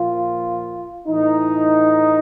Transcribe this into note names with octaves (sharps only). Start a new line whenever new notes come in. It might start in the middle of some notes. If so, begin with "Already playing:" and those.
Already playing: A#2 F3 F4
A2 E3 D#4